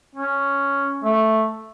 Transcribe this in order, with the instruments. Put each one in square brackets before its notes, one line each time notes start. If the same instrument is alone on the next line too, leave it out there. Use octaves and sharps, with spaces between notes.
[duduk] C#4
A3